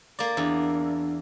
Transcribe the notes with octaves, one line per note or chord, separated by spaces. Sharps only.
A#3 D5
E2 D4